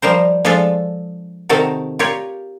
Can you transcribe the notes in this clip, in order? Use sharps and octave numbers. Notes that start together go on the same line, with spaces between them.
F3 G3 A#4 C5
F3 G#3 D4 F4 A4 E5
C3 D#3 F#4 A4 A#4
F4 G4 A#4 C#5